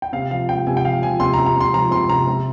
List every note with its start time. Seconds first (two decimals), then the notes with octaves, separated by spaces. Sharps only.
0.02 G5
0.13 C3 F5
0.31 F3 F5
0.49 C3 G5
0.67 C3 G#5
0.77 G5
0.85 F3 F5
1.02 F3 G#5
1.20 C3 C6
1.34 A#5
1.39 C3
1.46 A#5
1.56 C3 C6
1.74 F3 A#5
1.91 C3 C6
2.09 C3 A#5
2.27 C3